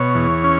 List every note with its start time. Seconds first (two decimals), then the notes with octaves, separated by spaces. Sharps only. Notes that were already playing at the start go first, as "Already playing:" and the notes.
Already playing: B2 C#5
0.15 E2
0.44 C#4